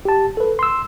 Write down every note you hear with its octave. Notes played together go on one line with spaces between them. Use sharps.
G4 A5
A4 B4
C6 E6